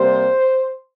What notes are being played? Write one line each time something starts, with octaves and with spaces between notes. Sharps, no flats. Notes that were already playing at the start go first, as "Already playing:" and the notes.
Already playing: C3 G3 A#3 C5